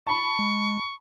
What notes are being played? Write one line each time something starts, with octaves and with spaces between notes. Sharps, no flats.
A5 B5 C#6
G#3